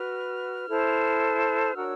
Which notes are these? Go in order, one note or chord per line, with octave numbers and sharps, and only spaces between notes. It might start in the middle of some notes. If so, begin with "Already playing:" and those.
Already playing: F#4 B4 F6
E4 A4 C5
D4 F#4 A#4 C#5 E6